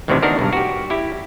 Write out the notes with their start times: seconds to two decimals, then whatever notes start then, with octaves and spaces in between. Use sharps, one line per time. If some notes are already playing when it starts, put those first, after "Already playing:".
0.08 A1 D2 A2 C3 D#3 E4
0.22 E2 D#3 D4 F#4 A#4
0.39 B1 G2
0.53 F#4 G4
0.90 E4 G4